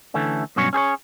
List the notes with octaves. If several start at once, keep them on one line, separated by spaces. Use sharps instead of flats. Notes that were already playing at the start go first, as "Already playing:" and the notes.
D3 E3 A3 C#4
G2 B2 F#3 C#4 C#5
C#4 G#4 C5 C#5